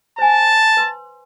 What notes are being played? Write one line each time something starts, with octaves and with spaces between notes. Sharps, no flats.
C5 G#5 A5
B4 C6